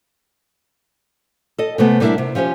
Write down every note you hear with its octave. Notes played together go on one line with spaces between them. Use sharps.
A4 D#5
C3 G#3 A3 B3
G3 B3 D4 E4 A#4 E5
C3
F3 C#4 G4 C5